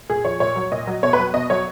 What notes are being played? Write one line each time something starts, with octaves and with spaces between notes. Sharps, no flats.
A#2 G#4
F3 C#5
A#2 C#5
F#3
A#2 D#5
F#3
B2 C#5
B4
F#3
B2 D#5
F#3 C#5